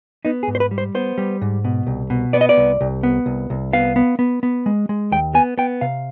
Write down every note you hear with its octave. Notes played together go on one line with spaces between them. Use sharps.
B3 D#4
G#4
G#2
C5
B4
G3
C5
B3 C5
G3
G#2
B2
C2
B2
B3 D5
D#5
D5
C2
C2
B3
C2
C2
B3 F5
B3
B3
B3
G#3
G#3
D#2 G5
B3 G#5
B3 G5
C3 F5